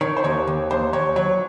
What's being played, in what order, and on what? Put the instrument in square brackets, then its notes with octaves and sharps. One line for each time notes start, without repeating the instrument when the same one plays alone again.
[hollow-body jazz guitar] D#3 [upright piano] C#5
[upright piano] C5
[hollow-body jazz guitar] D#2 [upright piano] C#5
[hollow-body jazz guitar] D#2
[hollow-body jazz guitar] D#2 [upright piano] C5
[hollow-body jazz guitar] D#2 [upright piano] C#5
[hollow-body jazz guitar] F#3 [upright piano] C#5